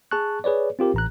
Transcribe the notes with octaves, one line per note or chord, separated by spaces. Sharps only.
G#4 A5 C#6 F#6
G#4 B4 C#5 D5
C4 F4 G4 A#4
A1 A#5 F#6